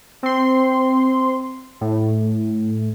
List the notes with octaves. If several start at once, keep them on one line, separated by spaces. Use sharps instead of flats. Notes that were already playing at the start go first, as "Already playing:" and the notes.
C4 C6
A2